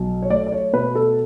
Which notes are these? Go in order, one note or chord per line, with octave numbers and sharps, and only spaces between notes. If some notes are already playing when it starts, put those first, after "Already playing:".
Already playing: B1 F#3
C#5
A3 D5
D5
C#5
B2 B4
A4